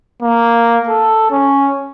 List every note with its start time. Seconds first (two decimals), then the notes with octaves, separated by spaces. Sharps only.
0.22 A#3
0.89 A4
1.31 C#4